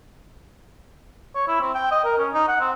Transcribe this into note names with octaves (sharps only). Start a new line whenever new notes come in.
C#5
E4
C4
G5
D#5
A#4
C#4
D#4
F#5
C4